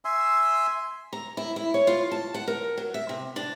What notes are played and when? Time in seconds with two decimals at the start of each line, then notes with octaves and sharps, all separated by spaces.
0.05 E5 G#5 C6 E6
1.13 A#5
1.37 E4
1.56 E4
1.74 C#5
1.87 F4
2.11 A5
2.34 F#5
2.48 A#4
2.78 F#3
2.94 E5
3.09 C3
3.36 D4